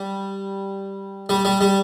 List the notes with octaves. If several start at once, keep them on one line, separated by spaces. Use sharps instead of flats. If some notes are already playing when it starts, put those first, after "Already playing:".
Already playing: G3
G3
G3
G3